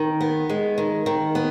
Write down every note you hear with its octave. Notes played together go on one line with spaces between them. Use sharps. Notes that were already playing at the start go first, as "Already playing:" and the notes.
Already playing: D#3
B3
G#3
D#3
D#3
B3